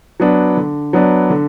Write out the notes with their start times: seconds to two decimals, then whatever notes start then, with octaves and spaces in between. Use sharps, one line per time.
0.20 F#3 B3 D4
0.57 D3
0.93 F#3 B3 D4
1.30 D3